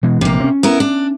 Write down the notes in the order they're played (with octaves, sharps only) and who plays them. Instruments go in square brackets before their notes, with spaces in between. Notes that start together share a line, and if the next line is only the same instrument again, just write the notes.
[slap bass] B2 E3 G#3
[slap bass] F1 A#1 [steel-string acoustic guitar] C3 A#3
[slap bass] C4 C#4
[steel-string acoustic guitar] B3 E4 A#4
D4